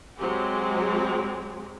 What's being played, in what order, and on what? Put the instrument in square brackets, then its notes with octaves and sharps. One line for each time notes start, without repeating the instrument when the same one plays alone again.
[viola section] F#3 G#3 C4 G4 G#4